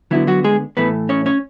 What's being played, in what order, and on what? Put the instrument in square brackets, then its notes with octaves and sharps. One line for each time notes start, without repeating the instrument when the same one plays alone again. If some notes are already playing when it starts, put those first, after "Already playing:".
[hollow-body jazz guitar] D3 E3 F#3 B3 E4
F#3 F#4
G#3 G#4
A2 E3 A3 B3 B4
C#4 C#5
C#4 C#5